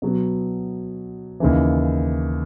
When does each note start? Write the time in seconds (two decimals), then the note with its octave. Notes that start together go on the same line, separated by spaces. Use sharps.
0.02 B2 F#3 B3
1.40 D#2 C#3 E3